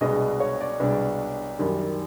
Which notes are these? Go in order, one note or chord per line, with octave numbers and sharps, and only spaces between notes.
C2 B2 G#3 B3 D4 D#5
C#5
D5
C2 B2 G#3 B3 D4
F#2 D#3 G3